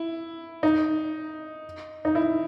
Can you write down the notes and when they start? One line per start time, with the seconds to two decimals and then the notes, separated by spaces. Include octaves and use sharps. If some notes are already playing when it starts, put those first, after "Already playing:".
Already playing: E4
0.63 D#4
2.05 D#4
2.15 E4